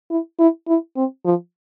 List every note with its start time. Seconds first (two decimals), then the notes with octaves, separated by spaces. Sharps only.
0.10 E4
0.39 E4
0.68 E4
0.97 C4
1.25 F3